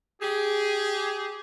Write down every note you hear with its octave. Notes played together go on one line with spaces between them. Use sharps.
G4 G#4